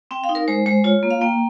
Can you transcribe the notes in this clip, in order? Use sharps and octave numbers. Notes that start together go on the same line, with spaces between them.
C4 G5
F5
D#4
A#4
G#3 C5
G#3 C5
F4 C#5
A#3
F5
A#3 G5